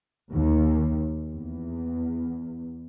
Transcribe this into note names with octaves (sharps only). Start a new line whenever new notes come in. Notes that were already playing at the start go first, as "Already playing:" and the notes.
D#2
E2